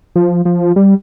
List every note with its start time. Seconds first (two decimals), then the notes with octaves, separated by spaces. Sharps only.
0.16 F3
0.45 F3
0.76 G3